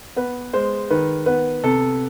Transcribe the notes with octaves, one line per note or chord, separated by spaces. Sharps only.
B3 B4
G#3 C5
D#3 B4
B3 B4
C3 A4